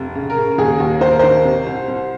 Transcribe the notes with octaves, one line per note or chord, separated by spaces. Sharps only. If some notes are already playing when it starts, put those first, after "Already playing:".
Already playing: F1
C#3
A#4
C#3
D#2 G#4
D#2
D#2 C5
A#4
D#3 C5
C3
C2
C2